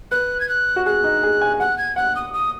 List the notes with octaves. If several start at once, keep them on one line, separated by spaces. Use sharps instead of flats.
B4 F#6
G#6
F#6
F#4
G#4 F#6
D#4
G#4
G#5
F#5 F#6
G#6
F#5 F#6
D#6
D#6